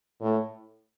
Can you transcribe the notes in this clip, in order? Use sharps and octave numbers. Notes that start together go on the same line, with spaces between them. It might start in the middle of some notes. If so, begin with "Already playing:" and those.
A2